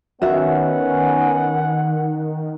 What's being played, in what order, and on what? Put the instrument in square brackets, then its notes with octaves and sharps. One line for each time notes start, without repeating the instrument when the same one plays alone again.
[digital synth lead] D#3 [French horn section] B3 C#4 [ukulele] F#4 E5 [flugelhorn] F#5